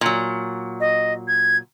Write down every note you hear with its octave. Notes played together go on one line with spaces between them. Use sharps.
A#2 F#3
D#5
G#6